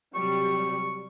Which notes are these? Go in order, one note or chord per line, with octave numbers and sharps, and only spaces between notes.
C3 F#3 G3 C#6